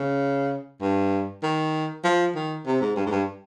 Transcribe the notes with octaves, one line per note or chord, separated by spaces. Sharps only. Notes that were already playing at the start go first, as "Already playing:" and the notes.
Already playing: C#3
G2
D#3
F3
D#3
C3
G#2
G2
G#2
G2